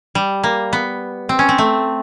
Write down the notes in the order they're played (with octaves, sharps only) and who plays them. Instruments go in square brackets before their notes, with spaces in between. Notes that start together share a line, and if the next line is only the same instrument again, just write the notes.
[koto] G3
A#3
B3
C4
C#4
C4
A3